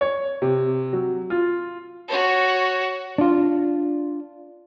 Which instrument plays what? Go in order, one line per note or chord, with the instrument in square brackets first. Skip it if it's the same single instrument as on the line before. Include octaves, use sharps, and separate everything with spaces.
[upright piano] C#5
C3
F#3
F4
[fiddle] F#4 C#5
[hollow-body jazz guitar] D4 F4